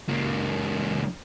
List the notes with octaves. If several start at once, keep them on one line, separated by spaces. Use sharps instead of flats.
C#2 A#3